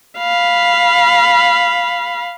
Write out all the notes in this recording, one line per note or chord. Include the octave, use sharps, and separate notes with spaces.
F5 B5